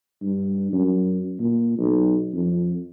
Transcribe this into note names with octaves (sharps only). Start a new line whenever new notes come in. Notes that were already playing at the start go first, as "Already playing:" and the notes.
G2
F#2
A#2
B1
F2